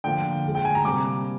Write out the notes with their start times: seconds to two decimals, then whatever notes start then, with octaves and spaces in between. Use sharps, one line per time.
0.04 D3 F3 A#3 G5
0.45 D3 G#3
0.55 G5
0.65 G#5
0.75 A#5
0.85 C3 G3 A#3 D6